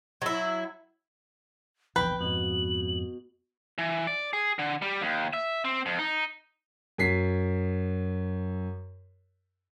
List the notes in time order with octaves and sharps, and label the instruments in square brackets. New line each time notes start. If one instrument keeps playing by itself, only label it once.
[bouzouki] F#3 E4
[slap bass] A#1 E2 D#3 [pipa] B4 [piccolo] G5
[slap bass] F2 G#2 [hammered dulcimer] B2 [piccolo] F#7
[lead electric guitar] E3
D5
G#4
D3
G3
D#2
E5
C4
F2
D#4
[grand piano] F#2 F#3 B6 C7